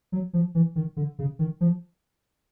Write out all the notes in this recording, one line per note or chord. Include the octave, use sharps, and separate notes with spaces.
F#3
F3
E3
D#3
D3
C#3
D#3
F3